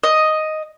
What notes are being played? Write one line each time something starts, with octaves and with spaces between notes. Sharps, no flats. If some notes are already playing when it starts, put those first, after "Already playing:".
D#5